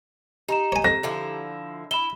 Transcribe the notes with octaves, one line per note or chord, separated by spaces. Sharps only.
D#4 G4 A#5 E7
C#5 G#5
F2 A#6
D3 F3 E4
E4 B5 E7 G7